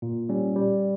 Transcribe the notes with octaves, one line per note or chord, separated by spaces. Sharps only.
A#2
G3 C#4
G3